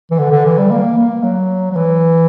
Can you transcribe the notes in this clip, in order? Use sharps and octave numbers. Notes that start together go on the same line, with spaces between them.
E3
D3
D3
E3
G3
A#3
A#3
F#3
F#3
E3